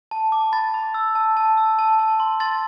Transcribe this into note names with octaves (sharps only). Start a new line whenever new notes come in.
A5
D6
B5 A6
B5
E6
A5
A5
E6
A5
A5
C6
C6 A6